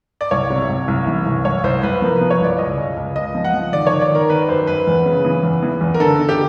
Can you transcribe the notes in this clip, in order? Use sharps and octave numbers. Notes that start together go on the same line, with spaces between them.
D5
C2 C#5
C3
C2
C2
E3
C2
C2 C#5
C2 C5
C2 B4
F3 A#4
B4
F3
C#5
C2 D5
C#2 D#5
C#2
C#2
C#2 D#5
F3
F#5
F3
D#3 D5
C#5
D#3
D5
D#3 A#4
D#3 B4
F#2 C5
F#2 B4
E2
C#3
E3
E2
E3
E2
A#4
D3 A4
D3
G4